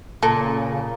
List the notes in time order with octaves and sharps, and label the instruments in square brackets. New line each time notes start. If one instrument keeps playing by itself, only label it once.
[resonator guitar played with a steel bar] A#2 [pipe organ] C#3 [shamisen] A4